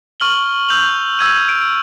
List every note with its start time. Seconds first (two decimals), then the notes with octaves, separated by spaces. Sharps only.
0.20 C#6 F6 F#7 G7
0.69 E6 G6 F7 F#7
1.19 E6 G#6 D#7
1.49 D7